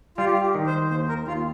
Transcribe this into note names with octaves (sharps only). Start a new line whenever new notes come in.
G3 F4
G4
F4
G4
D#3
C5
D#2 C5
A#4
D#2 F4